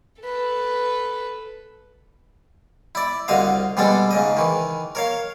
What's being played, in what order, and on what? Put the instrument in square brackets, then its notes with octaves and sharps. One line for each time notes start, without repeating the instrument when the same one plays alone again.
[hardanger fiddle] A4 B4
[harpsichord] E4 D5
C2 D3 F#4 D#5 F5
B2 G3 G#3 D4 A4
G#2 C#3 D#5
D#3 E3
A#4 C#5 F5